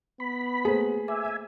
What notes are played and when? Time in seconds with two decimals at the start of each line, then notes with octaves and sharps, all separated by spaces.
0.20 B3 B5
0.65 A3 A#3 G#4 A4 C5
1.08 E5 G#5 D6